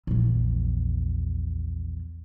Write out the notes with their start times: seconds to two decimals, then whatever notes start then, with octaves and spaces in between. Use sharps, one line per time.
0.07 A#1 E2